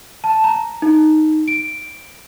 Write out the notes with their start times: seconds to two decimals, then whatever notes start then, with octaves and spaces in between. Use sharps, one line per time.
0.24 A5
0.44 A#5
0.82 D#4
1.48 D7